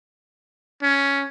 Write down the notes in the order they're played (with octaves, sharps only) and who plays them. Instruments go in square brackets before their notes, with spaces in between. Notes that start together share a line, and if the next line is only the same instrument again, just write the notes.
[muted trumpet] C#4